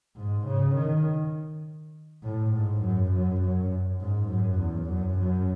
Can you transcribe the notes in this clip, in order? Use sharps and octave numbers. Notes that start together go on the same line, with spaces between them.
G#2
C#3
D#3
A2
G#2
F#2
F#2
F#2
G#2
F#2
E2
F#2
F#2